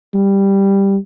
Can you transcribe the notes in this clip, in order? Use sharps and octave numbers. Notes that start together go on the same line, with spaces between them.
G3